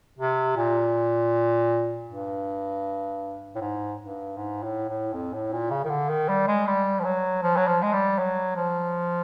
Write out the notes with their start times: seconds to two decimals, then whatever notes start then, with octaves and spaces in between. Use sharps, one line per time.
0.18 C3
0.56 A#2
2.09 G2
3.55 A2
3.61 G#2
4.00 G2
4.37 G#2
4.63 A2
4.89 A2
5.14 F2
5.34 A2
5.53 A#2
5.71 C#3
5.84 D#3
5.90 D3
6.09 D#3
6.28 G3
6.47 G#3
6.67 G3
6.99 F3
7.04 F#3
7.43 F3
7.57 F#3
7.68 F3
7.82 G#3
7.93 G3
8.18 F#3
8.56 F3